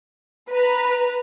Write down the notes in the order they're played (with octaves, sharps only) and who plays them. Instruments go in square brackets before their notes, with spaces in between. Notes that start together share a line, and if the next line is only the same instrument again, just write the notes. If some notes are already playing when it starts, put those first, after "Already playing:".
[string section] B4 A#5